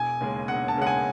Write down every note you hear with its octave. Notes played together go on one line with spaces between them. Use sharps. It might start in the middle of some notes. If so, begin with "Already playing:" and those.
Already playing: E1 G#5
D#2 C#3 G#3
E1 F#5
A5
D#2 C#3 G#3 F#5
G#5